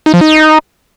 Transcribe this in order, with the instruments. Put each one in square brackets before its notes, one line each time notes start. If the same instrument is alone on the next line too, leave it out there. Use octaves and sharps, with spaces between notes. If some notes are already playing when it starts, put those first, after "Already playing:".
[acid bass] D#4
F3
D#4